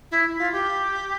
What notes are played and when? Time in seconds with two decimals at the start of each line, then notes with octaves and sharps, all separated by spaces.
0.11 E4
0.39 F4
0.52 G4